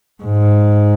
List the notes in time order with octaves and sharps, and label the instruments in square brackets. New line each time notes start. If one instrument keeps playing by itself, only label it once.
[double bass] G#2